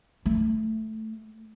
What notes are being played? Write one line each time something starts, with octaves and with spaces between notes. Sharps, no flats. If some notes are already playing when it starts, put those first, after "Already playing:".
A3